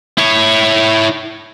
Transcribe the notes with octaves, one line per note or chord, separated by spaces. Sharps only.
E4 C#5